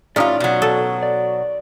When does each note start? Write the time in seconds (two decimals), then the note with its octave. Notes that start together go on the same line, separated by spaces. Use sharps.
0.16 A2 C#4 D#4 F4 G4 D5
0.40 B2 F#3
0.62 A4
1.03 D5